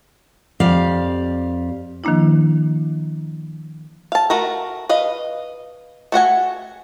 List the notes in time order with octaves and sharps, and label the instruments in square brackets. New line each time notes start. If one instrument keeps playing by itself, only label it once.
[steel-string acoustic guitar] F2 G4 D5 F5
[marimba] D#3 F3 A#3 D4 E4
[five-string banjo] F5 A5
A3 F#4 A#4
B4 D#5 F5
A3 F#4 F#5 G#5